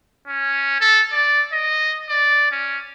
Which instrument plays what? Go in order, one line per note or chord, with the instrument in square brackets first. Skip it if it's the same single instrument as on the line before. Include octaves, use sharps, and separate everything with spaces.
[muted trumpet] C#4
A4
D5
D#5
D5
C#4